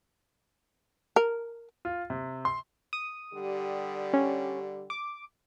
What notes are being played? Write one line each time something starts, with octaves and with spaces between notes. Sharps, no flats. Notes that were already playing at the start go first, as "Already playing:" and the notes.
A#4
F4
C3
C6
D#6
D3 G3 G4
C#4
D6